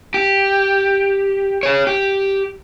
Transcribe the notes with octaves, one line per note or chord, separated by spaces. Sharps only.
G4
G#4 C#5
G4